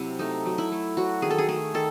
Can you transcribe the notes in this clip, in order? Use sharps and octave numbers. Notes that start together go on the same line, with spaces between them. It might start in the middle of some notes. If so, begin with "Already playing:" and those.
Already playing: C3 F#3 E4
A3 D#4
F#3
E4
A3
F#3 F#4
D#3 G#4
A4
G#4
A3 G#4
D#3 A4